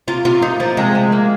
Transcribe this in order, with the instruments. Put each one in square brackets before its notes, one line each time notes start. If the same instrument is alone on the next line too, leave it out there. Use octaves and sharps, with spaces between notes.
[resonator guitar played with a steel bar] C3 [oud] F4
[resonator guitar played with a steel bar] C3 [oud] F4
[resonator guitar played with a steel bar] A#3 [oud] D#4
[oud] F3 [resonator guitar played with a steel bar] A#3
[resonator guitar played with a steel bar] C3 [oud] G#3
[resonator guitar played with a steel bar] C3
A#3